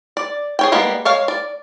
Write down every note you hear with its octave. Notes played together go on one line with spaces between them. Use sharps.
D5
G#4 C#5 G5
G3 G#3 A#3 B3
G#3 C#5 F5
D5